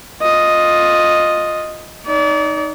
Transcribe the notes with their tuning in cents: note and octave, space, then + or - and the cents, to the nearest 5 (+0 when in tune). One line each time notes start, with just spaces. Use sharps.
F4 +15 D#5 +0
D#4 +0 D5 -35